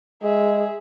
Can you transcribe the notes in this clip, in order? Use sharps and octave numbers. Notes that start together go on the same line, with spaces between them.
G#3 G#4 E5